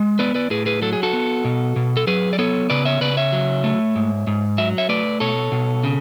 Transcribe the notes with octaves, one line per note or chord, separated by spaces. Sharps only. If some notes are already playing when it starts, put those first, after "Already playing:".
Already playing: G#3
B3 B4 D5
B4 D5
A2 G#4 B4
G#4 B4
F#3 A4
G#4
F#4 A4
B3
B2
B2
A4
F#3 G#4 B4
D5
B3 A4 C#5
C#3 B4 D5
C#5 E5
C#3 B4 D5
C#5 E5
F#3
A3
G#2
G#2
F#3 E5
C#5 E5
A3 B4 D5
B2 A4 C#5
B2
C#3